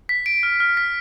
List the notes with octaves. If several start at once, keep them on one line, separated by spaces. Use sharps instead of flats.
B6
D7
F6
F6
B6